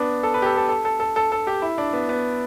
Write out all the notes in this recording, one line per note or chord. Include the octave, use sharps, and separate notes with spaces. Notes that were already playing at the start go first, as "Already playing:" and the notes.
Already playing: B3 D4
A4
B4
G4
A4
A4
A4
A4
A4
A4
A4
G4
E4
D4
B3
B3